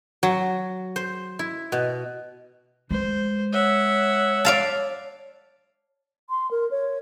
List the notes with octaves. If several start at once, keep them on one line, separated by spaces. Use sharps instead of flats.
F#3
C5
E4
B2
G#3 C5
C#5 E5 F#5
D5 F5 A5
C6
A#4
C#5